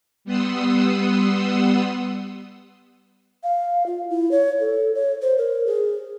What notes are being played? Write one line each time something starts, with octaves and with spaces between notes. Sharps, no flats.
G3 B3 F#5 C6 D#6 E6
F5
F4
E4
C#5
A4
C#5
C5
A#4
G#4